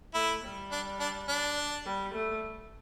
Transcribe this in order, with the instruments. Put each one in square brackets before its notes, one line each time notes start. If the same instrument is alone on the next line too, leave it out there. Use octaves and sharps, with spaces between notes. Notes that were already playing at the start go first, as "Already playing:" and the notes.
[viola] A3 [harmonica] E4
[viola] G3
[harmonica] D4
D4
D4
[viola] G3
A3